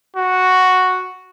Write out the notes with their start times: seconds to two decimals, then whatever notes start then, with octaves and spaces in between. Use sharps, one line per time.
0.16 F#4